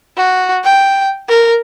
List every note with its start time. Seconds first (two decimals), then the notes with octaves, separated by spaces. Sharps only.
0.17 F#4
0.64 G5
1.29 A#4